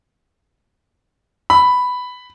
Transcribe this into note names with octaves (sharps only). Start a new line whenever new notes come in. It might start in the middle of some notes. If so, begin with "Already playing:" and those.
B5